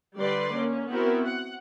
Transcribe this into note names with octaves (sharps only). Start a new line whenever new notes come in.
D3 G3 B4 D5 C6
A#3 C#4
B3 C4 E4 F#4 A#4
F#5